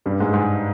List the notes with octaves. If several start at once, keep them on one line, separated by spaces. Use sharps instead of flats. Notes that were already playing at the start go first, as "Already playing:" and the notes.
G2 G3
G#2 G#3
G#2 G#3